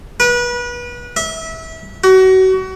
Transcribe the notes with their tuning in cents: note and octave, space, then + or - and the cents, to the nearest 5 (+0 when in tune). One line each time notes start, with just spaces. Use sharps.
B4 -30
E5 -25
F#4 +30